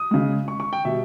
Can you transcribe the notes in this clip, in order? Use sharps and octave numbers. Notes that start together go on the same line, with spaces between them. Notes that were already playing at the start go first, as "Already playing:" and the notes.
Already playing: D#6
C#3 G#3
C#6
C#6
G5
B2 G3 E5